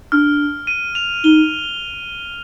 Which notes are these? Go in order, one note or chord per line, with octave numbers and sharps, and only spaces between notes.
D4 F6
D#7
F7
D#4 G7